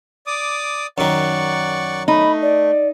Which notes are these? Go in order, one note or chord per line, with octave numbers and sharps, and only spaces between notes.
D5 D6 D#6
F#2 D#3 D5 F#5 C#6
A3 D#4 B5
D5